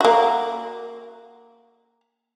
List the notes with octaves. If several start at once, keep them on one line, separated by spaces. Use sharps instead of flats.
A#3 F#4